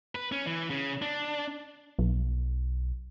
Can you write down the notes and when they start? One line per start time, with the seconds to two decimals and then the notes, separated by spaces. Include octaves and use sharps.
0.15 B4
0.32 C#4
0.47 E3
0.70 C#3
1.02 D4
1.99 B1